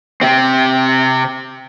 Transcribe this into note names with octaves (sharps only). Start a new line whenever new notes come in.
C3 C4